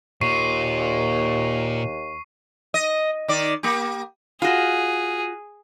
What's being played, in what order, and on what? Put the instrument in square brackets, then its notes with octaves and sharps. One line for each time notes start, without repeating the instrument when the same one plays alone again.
[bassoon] D#2 [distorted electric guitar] A#2 [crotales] C#6 C7 D#7
[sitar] D#5
D#3 D5
A#3 G4
[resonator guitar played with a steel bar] F4 F#4 [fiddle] G#4